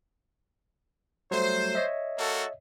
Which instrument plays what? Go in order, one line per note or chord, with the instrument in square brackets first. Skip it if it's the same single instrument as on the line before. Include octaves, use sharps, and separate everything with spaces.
[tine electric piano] F#3 G3 A3 [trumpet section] C5
[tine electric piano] C#5 D#5 E5
[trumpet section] A#3 F#4 A4